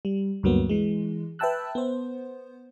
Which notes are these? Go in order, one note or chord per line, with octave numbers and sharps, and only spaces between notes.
G3
D2 G2 F#3 A#3 B3
E3 G#3
B4 E5 G5 A5 E6 F#6
B3 C5